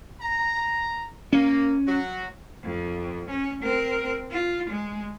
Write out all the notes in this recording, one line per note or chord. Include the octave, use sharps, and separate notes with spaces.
A#5
A#3 C#4
F#3 F#4
F2
C#4
C4 A#4
F4
G#3